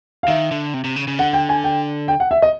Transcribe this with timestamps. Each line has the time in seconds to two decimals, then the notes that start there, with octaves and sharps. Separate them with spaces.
0.23 F5
0.28 D#3 E5
0.51 D3
0.74 C3
0.84 C3
0.96 C#3
1.08 C#3
1.19 D3 F#5
1.33 G5
1.49 G#5
1.64 G5
2.08 G5
2.20 F#5
2.31 E5
2.42 D#5